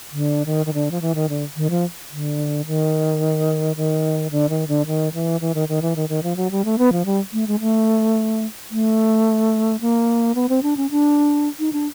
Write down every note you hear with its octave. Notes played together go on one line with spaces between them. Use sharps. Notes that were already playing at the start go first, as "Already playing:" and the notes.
D3
D#3
D#3
D3
F3
E3
D#3
D3
D#3
F3
D3
D#3
D#3
D3
D#3
D3
D#3
E3
E3
D#3
D#3
E3
D#3
D#3
F3
F#3
G3
A3
B3
F3
G3
A3
G#3
A3
A3
A#3
B3
C4
D4
C#4
D4
D#4
D4